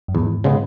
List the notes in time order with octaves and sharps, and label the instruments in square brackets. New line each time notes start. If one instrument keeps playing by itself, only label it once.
[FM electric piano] F#2
[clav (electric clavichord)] E2 [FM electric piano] G#2
[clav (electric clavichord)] C#3 G#3 B3